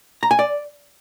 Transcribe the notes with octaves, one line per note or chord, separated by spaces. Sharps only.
A#5
G#5
D5